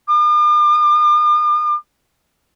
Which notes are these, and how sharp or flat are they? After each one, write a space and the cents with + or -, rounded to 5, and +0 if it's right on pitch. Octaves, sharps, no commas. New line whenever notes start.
D6 +45